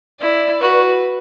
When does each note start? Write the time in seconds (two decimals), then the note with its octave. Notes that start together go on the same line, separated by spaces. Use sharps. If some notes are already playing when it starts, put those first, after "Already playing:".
0.21 E4 D5
0.60 F#4 B4